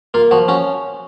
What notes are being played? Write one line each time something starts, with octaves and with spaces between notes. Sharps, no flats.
A#3 F4
F3 F#4
C#4 F#4